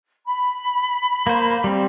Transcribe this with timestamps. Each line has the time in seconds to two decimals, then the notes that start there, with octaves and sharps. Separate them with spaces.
0.25 B5
1.27 A#3 C5
1.64 G3 C4